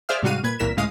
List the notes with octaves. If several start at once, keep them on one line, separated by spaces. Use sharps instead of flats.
G#4 C5 D5 E5 F5 F6
G#2 C3 G3 F#4 F5 D#7
A#2 B4 G#6
C2 A#2 E3 A#4 B6 E7
C#2 A2 G#3 F5 D#6